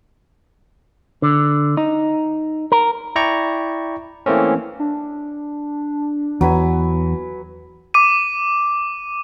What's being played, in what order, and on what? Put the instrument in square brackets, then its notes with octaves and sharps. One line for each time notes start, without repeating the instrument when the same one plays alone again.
[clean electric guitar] D3
D#4
A#4
[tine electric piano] E4 D5 G5 A#5 C#6
E3 A3 A#3 C4 C#4
[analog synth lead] D4
[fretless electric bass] E2 [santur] F#3 B4 G#5
[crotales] D6 D#7